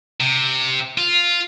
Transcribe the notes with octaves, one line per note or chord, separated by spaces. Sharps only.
C3
F4